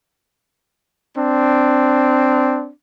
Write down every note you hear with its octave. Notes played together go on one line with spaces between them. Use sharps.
C4 D4